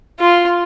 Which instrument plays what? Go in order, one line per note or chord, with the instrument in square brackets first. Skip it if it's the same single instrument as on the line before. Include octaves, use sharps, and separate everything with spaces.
[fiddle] F4